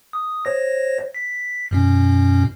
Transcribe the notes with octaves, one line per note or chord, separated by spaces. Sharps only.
D#6
C5 C#5 A#6
B6
F#2 B2 C#4